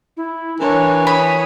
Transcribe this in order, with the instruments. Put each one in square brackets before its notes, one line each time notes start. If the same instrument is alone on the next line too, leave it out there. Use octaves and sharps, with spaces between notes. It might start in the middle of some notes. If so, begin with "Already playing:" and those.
[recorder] E4
[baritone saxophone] E3 [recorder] D4 [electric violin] A#4 C#5
[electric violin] C#5 D#6 [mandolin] B5